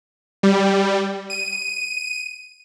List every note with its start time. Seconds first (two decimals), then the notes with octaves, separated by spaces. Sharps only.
0.43 G3
1.30 D#7